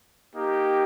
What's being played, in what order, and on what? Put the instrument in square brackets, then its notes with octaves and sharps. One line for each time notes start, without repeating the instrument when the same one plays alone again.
[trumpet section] A#3 D#4 G4